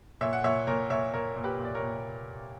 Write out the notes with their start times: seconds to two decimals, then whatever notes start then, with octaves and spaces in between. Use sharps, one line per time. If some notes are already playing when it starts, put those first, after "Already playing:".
0.21 A#2 C#5 E5
0.33 F#5
0.44 A#2 C#5 E5
0.67 A#2 A#4 C#5
0.90 A#2 C#5 E5
1.13 A#2 A#4 C#5
1.36 A#2
1.44 G4 B4
1.59 A#2
1.65 D5
1.75 A#4 C#5
1.82 A#2